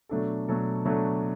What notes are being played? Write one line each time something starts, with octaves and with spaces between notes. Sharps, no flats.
B2 F#3 A3 D4 A4
B2 F#3 A3 D4 A4
B2 F#3 A3 D4 A4